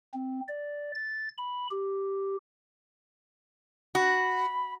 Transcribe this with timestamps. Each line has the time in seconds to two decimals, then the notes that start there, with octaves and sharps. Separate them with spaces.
0.14 C4
0.48 D5
0.95 A6
1.38 B5
1.71 G4
3.95 F#4 B5